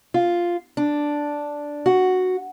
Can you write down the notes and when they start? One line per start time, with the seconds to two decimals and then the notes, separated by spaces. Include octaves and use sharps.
0.14 F4
0.77 D4
1.86 F#4